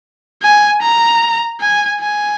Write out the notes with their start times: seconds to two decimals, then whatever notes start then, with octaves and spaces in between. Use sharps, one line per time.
0.43 G#5
0.82 A#5
1.61 G#5
2.00 G#5